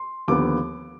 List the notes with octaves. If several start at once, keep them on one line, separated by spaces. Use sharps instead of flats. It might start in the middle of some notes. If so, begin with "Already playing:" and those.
Already playing: C6
D#2 D3 F3 B3 D6